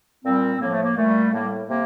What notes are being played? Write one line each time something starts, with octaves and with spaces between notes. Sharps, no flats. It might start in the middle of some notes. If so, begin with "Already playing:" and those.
A#2 G3 C4
A2 F3 A#3
A3
A#3
A#2 G3 A3
A2 G3 A#3
C3 A#3